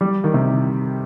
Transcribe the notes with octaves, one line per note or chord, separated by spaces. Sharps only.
G3
D#3
C3